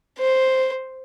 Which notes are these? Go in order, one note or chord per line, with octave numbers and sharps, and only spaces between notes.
C5